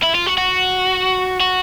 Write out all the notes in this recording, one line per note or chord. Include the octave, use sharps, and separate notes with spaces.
E4
F4
F#4
F#4
F#4